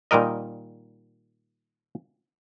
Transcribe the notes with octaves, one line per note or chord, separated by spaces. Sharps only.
A#2 D#3 G3 A#4 D#5